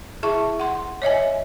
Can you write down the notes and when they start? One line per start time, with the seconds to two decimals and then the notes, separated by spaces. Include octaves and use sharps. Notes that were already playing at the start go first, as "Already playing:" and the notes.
0.23 E4 G#4 E5 A5 C#6
0.60 F#5 C6
1.02 C#5 D#5 E5 G#5